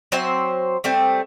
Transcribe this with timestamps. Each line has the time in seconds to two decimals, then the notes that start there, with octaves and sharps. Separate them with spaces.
0.12 F#3 C4 C5 E5
0.84 G3 A3 C4